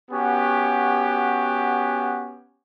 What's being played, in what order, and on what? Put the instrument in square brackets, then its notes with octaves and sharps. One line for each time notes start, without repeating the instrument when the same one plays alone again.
[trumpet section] B3 C#4 F#4 G4